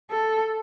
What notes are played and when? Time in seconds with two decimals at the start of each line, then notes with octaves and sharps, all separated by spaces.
0.11 A4